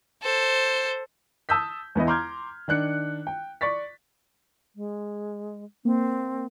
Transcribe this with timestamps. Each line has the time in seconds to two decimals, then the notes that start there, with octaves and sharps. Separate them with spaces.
0.23 A4 C5
1.49 A5 D#6 E6 G6 B6
1.95 E2 B3 E4 D#5
2.07 A#5 C6 D6 F6 G6 G#6
2.68 D#3 D4 F#6 C#7
3.27 G5
3.61 D5 C#6 A6 B6
4.76 G#3
5.85 A#3 C4